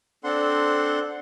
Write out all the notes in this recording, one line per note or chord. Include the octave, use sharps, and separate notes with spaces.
C4 D4 A4 F#5 C6